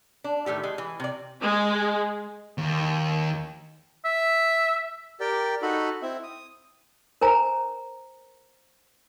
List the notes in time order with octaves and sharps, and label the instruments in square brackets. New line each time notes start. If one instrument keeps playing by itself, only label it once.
[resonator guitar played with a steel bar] D4
A2 D#3 A3 G4
G#3
E3
C3 D5
[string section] G#3
[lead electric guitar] D#2
[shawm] E5
[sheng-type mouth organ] G4 A#4 D5 G5
D#4 F#4 A4 B5
C4 E4 E5
D#6
[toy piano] A#4 C5 G#5 A#5